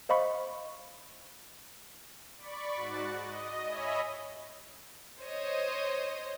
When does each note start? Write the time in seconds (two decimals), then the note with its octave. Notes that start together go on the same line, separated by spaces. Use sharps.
0.09 C5 D#5 F5 B5 C#6
2.36 D5 B5 C#6
2.75 G#2 F#4 F#6 A6
3.20 D#5
3.63 C#5 D#5 E5 G#5 B5
5.20 C5 C#5 D#5